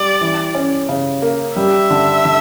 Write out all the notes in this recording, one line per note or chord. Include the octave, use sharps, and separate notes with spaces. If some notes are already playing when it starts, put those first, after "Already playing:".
Already playing: G3 D5
E3
C#4
C#3
A#3
G3 E5
D3
D3